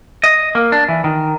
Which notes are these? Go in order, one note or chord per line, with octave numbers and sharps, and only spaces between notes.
D#5
A#3
D4
E3
D#3